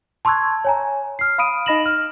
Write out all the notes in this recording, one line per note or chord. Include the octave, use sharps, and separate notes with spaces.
A5 C6 C#6 E6 F#6 G#6
C#5 G#5 A#5
F6 C7
F5 B5 D#6 D7 D#7
D#4 D#5 B5 A#6 E7 F#7
F6